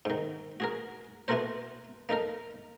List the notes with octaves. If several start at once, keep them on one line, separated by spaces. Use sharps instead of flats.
G#2 D#3
F#4 G#4 A#4
B3 E4 F#4 A4 A#4 C5
A#3 D#4 A4 A#4